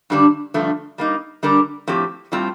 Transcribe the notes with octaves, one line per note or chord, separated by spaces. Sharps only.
G2 D3 G3 D4
G2 D3 F3 A3
G3 A#3 D#4
D3 G3 D4 G4 A#4
A2 F3 C4 G4
A2 G3 C4 F4